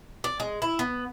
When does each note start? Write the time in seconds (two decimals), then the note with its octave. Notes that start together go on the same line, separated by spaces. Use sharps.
0.24 D5
0.40 G#3
0.62 E4
0.79 B3